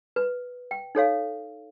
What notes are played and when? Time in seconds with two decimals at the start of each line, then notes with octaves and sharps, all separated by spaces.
0.16 B4
0.71 G5
0.95 D#4 A4 C#5 F5